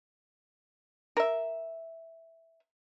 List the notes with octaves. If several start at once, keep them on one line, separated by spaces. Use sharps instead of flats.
A#4 E5